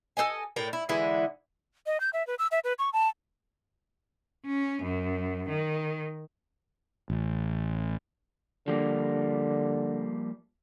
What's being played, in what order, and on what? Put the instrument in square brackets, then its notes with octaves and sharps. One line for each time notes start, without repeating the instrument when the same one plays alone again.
[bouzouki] A4 C5 D#5 G#5
A2 A#4 D5 G5
E4
D3 E3 G#3 E4
[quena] D#5
G6
E5
B4
E6
E5
B4
C#6
A5
[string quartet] C#4
F#2
D#3
[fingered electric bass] A1
[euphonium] D3 [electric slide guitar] F3 G3 A#3